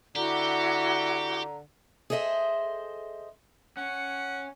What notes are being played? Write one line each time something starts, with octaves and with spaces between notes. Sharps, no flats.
D3 E4 F#4 G4 A#5 D6
G#4 A4 C5 D#5 E5
C#4 F#5